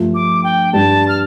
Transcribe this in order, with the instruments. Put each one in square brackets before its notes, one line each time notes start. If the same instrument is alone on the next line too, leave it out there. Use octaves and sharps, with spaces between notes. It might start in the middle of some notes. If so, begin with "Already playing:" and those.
Already playing: [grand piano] G2 F3 A3 F4
[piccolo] D6
G5
[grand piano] G2 G3 D4 G4 [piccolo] A5
[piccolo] F6